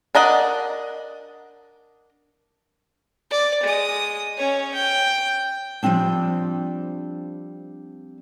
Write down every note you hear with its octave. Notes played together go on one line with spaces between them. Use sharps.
D4 A#4 D#5 F#5
D5
G#3 D#6
C#4 C#5
G5
F3 G3 A3 C4 D4